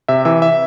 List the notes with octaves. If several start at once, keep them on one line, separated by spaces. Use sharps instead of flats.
C3 E5
E3 E5
E5